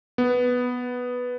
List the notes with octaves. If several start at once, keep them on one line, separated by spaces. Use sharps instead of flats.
B3